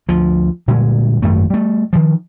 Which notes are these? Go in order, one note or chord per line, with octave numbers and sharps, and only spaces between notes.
D2 F3
A#2 D3 G3 G#3
G#1 F#2 A3
G3 A3
D#3 F3